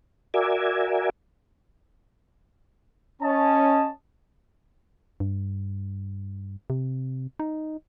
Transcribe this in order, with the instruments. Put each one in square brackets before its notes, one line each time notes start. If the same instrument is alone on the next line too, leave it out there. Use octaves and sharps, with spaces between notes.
[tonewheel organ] F#4 A#4 D5 E5 G#5
[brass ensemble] C#4 [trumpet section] D#5 A5
[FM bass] G2
C3
D#4